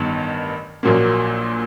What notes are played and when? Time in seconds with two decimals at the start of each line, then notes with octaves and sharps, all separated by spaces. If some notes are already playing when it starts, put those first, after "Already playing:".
Already playing: A1 G2 D#3 B3
0.83 A#1 A#2 F#3 A#3